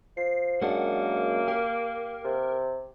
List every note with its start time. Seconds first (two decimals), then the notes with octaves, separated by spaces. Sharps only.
0.17 F3 C7
0.61 F#2 F#3 G#3 A#3 D4 F#5
1.48 G4 A#4
2.25 C3